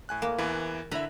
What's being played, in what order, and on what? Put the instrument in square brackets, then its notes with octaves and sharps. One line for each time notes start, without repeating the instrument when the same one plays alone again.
[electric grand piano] A2 G#5 F#6
[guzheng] A#3
[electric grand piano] E2 E3 [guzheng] B4
[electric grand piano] D3 E4 E5 [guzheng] B4 A#5 B5